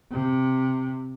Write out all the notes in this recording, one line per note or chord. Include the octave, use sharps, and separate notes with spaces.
C3